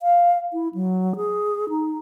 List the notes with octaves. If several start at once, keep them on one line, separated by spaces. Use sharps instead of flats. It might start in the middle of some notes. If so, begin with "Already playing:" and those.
F5
E4
F#3
G#4
D#4